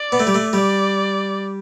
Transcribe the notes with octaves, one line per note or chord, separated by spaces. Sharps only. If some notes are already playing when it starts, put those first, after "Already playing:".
Already playing: D5
B3
A3
G3
A3
G3 D5